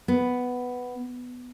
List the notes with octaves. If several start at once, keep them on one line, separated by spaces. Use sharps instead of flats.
B3